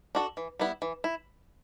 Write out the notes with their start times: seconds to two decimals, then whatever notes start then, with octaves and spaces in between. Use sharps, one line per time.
0.15 D4 F#4 A4
0.37 E3
0.59 G3 B3 E4
0.82 E3
1.04 E4